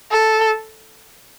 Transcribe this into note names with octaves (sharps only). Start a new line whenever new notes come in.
A4